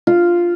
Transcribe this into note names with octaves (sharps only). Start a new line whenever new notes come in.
F4